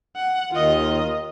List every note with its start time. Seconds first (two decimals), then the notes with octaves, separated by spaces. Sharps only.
0.16 F#5
0.52 D#2 D#3 F4 D#5